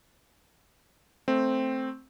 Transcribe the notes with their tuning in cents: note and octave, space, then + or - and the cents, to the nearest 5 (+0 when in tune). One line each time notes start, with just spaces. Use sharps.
A3 +0 C4 +0